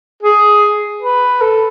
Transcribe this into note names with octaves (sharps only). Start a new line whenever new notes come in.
G#4
B4
A4